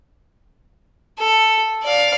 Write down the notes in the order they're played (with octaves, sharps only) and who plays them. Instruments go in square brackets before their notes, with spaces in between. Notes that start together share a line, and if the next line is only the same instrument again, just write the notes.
[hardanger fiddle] A4
D5 F5